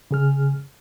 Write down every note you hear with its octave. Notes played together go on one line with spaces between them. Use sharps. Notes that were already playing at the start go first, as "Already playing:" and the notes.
C#3 G#4 F6